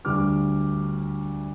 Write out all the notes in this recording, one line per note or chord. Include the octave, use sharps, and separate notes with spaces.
D2 D3 G3 D6 F6